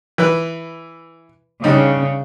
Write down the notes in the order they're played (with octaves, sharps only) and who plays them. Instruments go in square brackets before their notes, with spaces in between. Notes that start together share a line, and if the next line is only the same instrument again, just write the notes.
[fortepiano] E3 B4
[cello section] C#3 [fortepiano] G3 D4 D#4